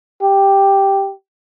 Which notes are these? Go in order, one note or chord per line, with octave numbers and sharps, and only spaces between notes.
G4